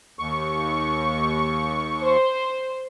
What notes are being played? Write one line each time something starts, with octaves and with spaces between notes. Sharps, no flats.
D#2 C#6
C5